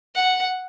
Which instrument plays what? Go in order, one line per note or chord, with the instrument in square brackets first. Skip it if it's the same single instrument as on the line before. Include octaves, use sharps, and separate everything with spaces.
[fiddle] F#5